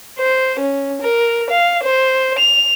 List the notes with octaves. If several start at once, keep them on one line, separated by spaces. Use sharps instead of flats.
C5
C#4
A#4
F5
C5
F7